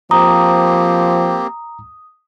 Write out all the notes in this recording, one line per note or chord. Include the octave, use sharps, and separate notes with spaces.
F3 A#3 C4 G4 A#5 D#6